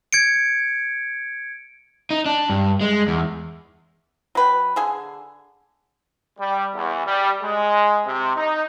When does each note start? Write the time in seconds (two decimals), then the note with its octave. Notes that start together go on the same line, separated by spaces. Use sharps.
0.13 G#6 C#7 D7
2.11 D#4
2.26 D4
2.50 G2
2.81 G#3
3.08 E2
4.35 F#3 B4 G5
4.76 D3 G#4 G#5
6.39 G3
6.74 E2
7.06 G3
7.43 G#3
8.06 C3
8.36 D#4